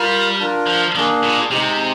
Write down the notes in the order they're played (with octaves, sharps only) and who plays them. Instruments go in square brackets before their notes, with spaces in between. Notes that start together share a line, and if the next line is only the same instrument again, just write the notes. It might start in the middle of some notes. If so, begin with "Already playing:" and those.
Already playing: [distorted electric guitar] G3 [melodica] F4 A#4 F5
[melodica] D4 F4 A#4
[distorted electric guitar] F3
[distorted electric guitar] D#3 [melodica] A#3 D4 G#4
[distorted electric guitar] A#2
[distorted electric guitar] C3 [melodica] G#3 C4 D#4 G4